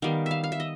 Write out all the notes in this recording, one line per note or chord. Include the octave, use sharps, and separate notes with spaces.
D#3 G3 B3 F5
E5 F5
F5
E5
D#5